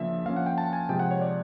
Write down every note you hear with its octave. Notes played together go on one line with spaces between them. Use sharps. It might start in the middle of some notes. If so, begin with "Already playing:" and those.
Already playing: C#3 F3 A#3 D4 E5
F3 A#3 C#4 F5
F#5
G5
A5
G#5
C3 F3 G#3 G5
F#5
C#5
D5